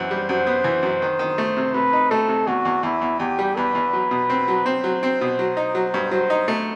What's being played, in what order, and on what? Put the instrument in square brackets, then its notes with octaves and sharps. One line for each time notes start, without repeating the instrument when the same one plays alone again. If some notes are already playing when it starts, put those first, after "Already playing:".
Already playing: [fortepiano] F#2 E3 [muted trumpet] C5
[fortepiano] G3
[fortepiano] F#2 [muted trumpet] C5
[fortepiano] B3
E3
F#2
D#3
D#3
A3
C3
[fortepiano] C3 [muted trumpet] B4
[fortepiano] D#4
[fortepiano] A3 [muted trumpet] A4
[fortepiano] C3
[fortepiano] E2 [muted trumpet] F#4
[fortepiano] E2
[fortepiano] E2 [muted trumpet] E4
[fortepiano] E2
[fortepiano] E2 [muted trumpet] G4
[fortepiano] G3
[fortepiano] E2 [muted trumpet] B4
[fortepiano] E2
F#3
B2
C4
F#3
[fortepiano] C4 [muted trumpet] C5
[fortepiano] F#3
C4
B2
F#3
D#4
F#3
G2
[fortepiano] F#3 [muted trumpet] C5
[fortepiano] D#4
A3